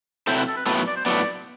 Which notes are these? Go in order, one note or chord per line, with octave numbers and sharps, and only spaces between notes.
C3 F#3 C4 E4 A4 C5
B4
A4
B4
A2 F#3 B3 A4
B4
D5
C5
A2 F#3 B3 D5